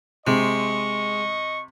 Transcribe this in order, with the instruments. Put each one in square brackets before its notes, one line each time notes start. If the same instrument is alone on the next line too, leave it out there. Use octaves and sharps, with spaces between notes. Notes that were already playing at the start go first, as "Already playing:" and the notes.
[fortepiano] C3 [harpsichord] G#3 [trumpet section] D#5 C#6